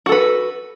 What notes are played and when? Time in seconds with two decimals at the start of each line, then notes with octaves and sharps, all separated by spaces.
0.06 F#4
0.09 A4
0.12 B4